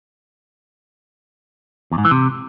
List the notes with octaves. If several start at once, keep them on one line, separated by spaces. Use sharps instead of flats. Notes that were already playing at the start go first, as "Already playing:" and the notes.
E2
G#2
E3
C3